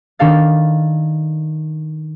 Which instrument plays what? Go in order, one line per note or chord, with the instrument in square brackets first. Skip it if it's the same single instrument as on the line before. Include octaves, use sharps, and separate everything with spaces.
[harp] D#3 D4 A4 F5 A6